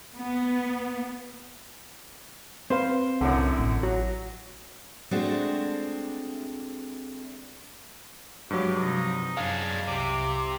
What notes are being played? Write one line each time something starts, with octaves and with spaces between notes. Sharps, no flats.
B3
C4 B4 C5 F5
C2 F#2 A2 D3
A1
F#3 F#4
G#3 A3 C4 D4 F#4
G2 F3 F#3 G#3 G4
C3 F3 D#4
F#2 G#3 D4 F5
C2 C3 D6